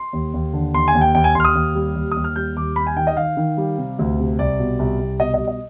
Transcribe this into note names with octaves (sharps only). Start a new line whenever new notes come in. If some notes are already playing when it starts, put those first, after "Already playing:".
Already playing: C6
D#2
D#2
D3
D#2 C6
G#5
D#2
G5
D#2 G5
G#5
D#2 C6 F6
D#6
D#2
G3
D#2
D#2 D#6
F6
G3 G6
D#2 D6
G3 B5
G#5
D#3 G5
D#5
D#3 F5
D#3
G3
C3
D2
C3
C2 D5
B2
C2
C2
B2 D#5
D#5
G3
D#5